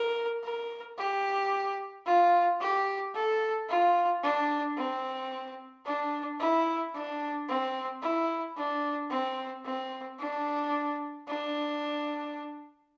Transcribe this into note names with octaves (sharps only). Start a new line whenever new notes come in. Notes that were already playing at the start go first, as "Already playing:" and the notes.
Already playing: A#4
A#4
G4
F4
G4
A4
F4
D4
C4
D4
E4
D4
C4
E4
D4
C4
C4
D4
D4